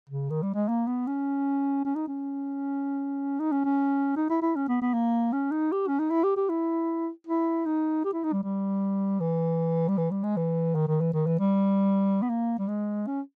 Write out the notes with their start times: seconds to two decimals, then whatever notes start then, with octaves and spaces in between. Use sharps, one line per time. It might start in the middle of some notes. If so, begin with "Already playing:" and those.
0.10 C#3
0.30 D#3
0.43 G3
0.55 G#3
0.68 A#3
0.87 B3
1.07 C#4
1.85 C#4
1.96 D#4
2.08 C#4
3.40 D#4
3.52 C#4
3.65 C#4
4.16 D#4
4.30 E4
4.42 E4
4.56 C#4
4.69 B3
4.82 B3
4.94 A#3
5.33 C#4
5.52 D#4
5.72 G4
5.88 C#4
6.00 D#4
6.11 E4
6.24 G4
6.37 G4
6.49 E4
7.27 E4
7.66 D#4
8.05 G4
8.13 E4
8.24 D#4
8.33 G3
8.43 G3
9.20 E3
9.89 G3
9.98 E3
10.11 G3
10.24 G#3
10.37 E3
10.75 D#3
10.87 D#3
11.01 E3
11.14 D#3
11.27 E3
11.40 G3
12.22 B3
12.30 A#3
12.59 G3
12.68 G#3
13.07 C#4